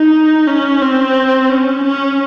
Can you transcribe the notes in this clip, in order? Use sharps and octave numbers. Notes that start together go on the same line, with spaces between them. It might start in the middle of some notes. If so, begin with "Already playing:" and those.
Already playing: D#4
C#4
C4
C#4
C#4